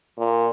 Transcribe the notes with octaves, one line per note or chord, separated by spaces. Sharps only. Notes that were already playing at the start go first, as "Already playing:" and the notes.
A#2